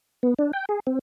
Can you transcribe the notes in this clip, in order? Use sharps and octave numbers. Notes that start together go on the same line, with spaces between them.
B3
D4
G5
G#4
C4